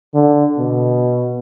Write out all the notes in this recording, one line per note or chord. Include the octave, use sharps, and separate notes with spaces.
D3
B2